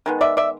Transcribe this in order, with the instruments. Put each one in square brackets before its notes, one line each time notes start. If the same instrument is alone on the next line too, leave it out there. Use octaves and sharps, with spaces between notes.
[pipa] D#3 G#3 B3
D5 E5
D5 E5